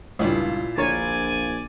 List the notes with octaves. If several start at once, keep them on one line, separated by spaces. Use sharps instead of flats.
C#2 G2 A#2 E4 F4
A#1 D3 A#4 C#5 D5 G#5